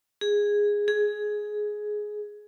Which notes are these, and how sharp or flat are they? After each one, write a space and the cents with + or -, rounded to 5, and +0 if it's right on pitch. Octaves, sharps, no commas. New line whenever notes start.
G#4 -10
G#4 +10